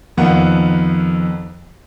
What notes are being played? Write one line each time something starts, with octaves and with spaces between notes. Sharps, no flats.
F2 D#3 A#3 B3 F#5